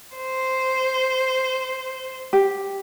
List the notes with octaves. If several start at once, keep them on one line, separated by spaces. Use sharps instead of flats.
C5
G4